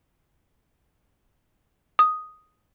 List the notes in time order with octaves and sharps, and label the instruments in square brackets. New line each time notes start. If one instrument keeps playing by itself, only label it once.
[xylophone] D#6